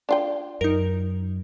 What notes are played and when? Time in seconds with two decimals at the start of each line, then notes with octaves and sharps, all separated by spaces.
0.09 D4 F4 G5
0.61 F#2 D#4 A#4